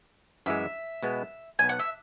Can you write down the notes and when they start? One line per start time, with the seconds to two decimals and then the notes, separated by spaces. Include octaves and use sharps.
0.46 F#2 E3 G#3 E5
1.03 B2 G#3 B3
1.59 B1 B2 B3 G#5
1.69 F#5
1.79 E5